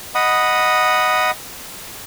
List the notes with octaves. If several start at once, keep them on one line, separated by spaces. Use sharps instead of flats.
D#5 F#5 B5 D#6